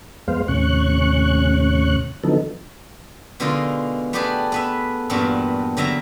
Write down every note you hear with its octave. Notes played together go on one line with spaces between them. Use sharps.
F2 G#3 B3 C5 F5
D#2 A2 C3 C#4 C#6 F#6
D3 F3 F#3 B3 D#4 A4
B2 D3 G#3 D#4 F4 A#4
A3 B3 D4 G4 G#4 B4
B3 B4 E5
E2 G2 A#2 B3 D4 F#4
E2 D3 F#3 E5 A#5